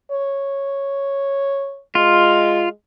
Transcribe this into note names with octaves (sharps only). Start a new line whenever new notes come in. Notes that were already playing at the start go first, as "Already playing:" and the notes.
C#5
G#3 F4